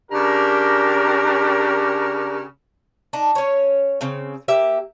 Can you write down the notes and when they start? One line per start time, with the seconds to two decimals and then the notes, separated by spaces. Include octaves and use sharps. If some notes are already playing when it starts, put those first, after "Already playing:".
0.11 C#3 D4 G4 A#4
3.13 D4 D#4
3.35 C#4 C#5
4.01 C#3 C4
4.48 A#3 G4 E5